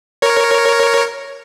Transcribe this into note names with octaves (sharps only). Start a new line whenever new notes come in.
A#4 C#5